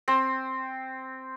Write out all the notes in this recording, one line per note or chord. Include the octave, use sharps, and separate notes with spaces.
C4